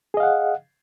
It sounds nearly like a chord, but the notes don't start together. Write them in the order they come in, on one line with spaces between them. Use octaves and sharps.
G#4 D#5 F5 F#5